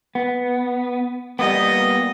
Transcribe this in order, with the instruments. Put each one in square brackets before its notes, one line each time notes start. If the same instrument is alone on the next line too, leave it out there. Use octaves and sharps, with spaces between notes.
[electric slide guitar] B3
[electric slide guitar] G3 A#3 B3 [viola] D#5